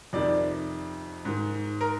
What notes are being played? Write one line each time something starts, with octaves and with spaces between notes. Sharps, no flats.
F2 C3 D#3 D5
G#2 D#3
A#4